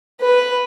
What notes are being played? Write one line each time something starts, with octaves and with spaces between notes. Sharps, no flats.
B4